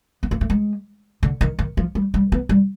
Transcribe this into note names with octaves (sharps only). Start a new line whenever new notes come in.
B3
A#3
A3
G#3
D3
D#3
D#3
F3
G3
G3
B3
G3